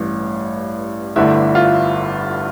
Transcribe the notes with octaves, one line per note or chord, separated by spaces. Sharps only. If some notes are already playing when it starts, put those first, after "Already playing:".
Already playing: A1 G2 E3
G1 G2 D3 A3 E4
F4